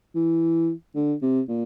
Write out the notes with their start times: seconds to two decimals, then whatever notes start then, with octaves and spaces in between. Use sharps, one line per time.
0.15 E3
0.95 D3
1.22 C3
1.49 A#2